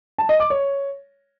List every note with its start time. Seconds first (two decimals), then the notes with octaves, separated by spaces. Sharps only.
0.18 A5
0.29 D#5
0.40 D6
0.50 C#5